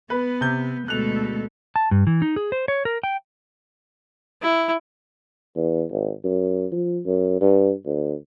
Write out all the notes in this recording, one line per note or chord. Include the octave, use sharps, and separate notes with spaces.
B3 B4
C3 G6
D2 B2 G#3 A4 F#6 F7
A5
G2
E3
D#4
G#4
C5
C#5
A#4
G5
E4
E2
G#1
F#2
F3
F#2
G2
D2